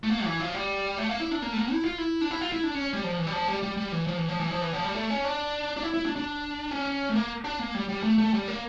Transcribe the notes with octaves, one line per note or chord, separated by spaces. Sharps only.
A3
A#3
E3
F3
G3
A3
A#3
E4
D4
A#3
A3
A#3
E4
F4
E4
D4
E4
F4
E4
D4
C#4
G3
F3
E3
G3
F3
G3
G3
G3
E3
F3
E3
F3
E3
F3
E3
F3
G3
A3
C#4
D4
D4
E4
E4
D4
D4
C#4
A3
A#3
D4
A#3
G3
G3
A3
A3
G3
A#3